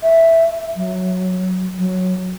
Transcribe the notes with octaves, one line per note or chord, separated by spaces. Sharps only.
E5
F#3
F#3